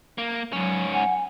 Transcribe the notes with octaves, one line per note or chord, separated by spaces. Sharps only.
A#3
G#2 F#3 C#4
F#5 G#5